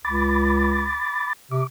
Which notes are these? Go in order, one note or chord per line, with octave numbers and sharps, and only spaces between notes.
C#2 B5 D6 A6
C3 D6